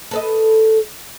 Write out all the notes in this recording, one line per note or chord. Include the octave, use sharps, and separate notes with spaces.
A4 B4 D#5